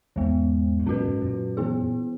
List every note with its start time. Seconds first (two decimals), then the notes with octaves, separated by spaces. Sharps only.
0.16 E2 G#2 E3 G#3 B3
0.79 G#2
0.86 F#2 A#2 C#4 F#4 B4
1.04 G#2 B2
1.16 B2
1.21 F#2 A#2
1.57 E3 B3 E4 G#4